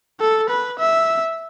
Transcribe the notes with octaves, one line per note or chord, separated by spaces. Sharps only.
A4
B4
E5